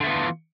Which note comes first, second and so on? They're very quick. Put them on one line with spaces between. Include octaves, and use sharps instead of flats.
D3 A3 B3 F4 E3